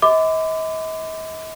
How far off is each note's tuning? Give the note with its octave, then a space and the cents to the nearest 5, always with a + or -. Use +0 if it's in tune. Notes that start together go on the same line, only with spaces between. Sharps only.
D#5 +45 B5 +45 D6 +0